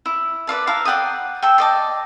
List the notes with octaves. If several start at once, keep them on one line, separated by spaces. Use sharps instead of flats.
E4
B4 D5 F5 A5
E4 F5 A5 A#5
D5 F#5 G5 D#6
A4 E5 G5
D5 D#5 A5